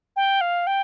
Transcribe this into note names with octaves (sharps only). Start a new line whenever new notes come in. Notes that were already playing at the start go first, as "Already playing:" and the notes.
G5
F5
G5